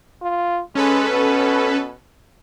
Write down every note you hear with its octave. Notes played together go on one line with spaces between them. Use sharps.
F4
G#3 C#4 A4 B4
B2